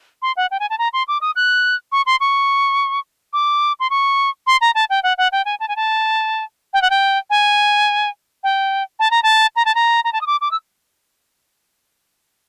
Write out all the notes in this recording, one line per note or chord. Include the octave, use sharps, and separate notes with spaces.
C6
F#5
G5
G#5
A5
A#5
C6
D6
D#6
F#6
C#6
C6
C#6
D6
C6
C#6
C6
A#5
A5
G5
F#5
F#5
G5
G#5
A5
G#5
A5
G5
F#5
G5
G#5
G5
A5
A#5
A5
A#5
A5
A#5
A#5
A5
D#6
D6
D6
E6